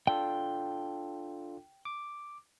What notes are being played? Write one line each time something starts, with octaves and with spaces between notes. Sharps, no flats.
D4 F4 A4 G5
D6